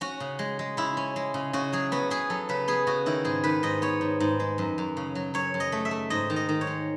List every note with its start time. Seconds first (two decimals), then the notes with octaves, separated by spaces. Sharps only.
0.01 C#4 F#4
0.20 C#3
0.39 G#3
0.59 G#3
0.77 C#3 E4
0.97 C#4
1.16 G#3
1.34 C#3
1.53 C#3 F#4
1.73 F#3 G#4
1.92 B3 F#4
2.10 B3 G#4
2.30 F#3 A4
2.49 C#3 B4
2.68 B3 G#4
2.87 C#3 F#4
3.06 D#3 E4
3.24 G#2 G#4
3.44 D#3 B4
3.63 G#2 D#5
3.82 B3 C#5
4.01 G#2
4.20 G#2
4.40 G#3
4.58 F#2
4.78 F#2
4.97 C#3
5.15 F#3
5.34 F#2 C#5
5.54 F#2
5.60 D#5
5.72 A3
5.85 E5
5.91 A3
6.10 G#2 D#5
6.30 D#3
6.36 D#5
6.49 D#3
6.61 C#5
6.67 G#3